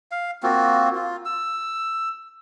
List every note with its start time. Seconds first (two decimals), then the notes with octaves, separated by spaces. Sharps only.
0.12 F5
0.43 A#3 C4 F4 F#4
0.95 F4
1.25 E6